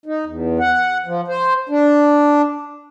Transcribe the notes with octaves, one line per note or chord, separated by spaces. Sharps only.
D#4
E2
F#5
F3
C5
D4